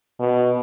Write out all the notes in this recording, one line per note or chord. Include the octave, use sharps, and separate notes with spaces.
B2